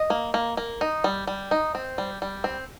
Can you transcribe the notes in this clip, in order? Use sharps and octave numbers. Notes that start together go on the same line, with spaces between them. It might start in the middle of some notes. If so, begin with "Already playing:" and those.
Already playing: D#5
A#3
A#3
A#3
D#4
G3
G3
D#4
C4
G3
G3
C4